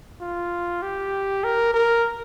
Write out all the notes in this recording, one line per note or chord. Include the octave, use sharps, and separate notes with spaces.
F4
G4
A#4
A#4